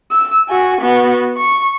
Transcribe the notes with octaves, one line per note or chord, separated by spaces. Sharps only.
E6
F#4 G#5
B3 F#4
C#6